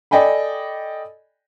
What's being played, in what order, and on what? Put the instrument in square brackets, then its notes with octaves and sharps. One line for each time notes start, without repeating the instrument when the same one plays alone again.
[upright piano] A4 D5 D#5 G5 G#5 B5